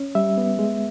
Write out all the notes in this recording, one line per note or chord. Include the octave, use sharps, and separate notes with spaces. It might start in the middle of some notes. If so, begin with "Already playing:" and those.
Already playing: C#4
G3 E5
B3
G#3